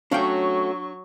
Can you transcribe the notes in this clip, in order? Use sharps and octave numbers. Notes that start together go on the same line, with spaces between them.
F#3 A3 C#4 D4 F#4 F5 G5 C#6